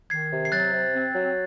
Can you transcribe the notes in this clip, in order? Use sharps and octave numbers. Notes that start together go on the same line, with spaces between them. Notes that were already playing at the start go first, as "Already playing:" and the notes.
D#3 G#6 C7
C3
C7
F#3 F#6 A6
C3
C4
F#3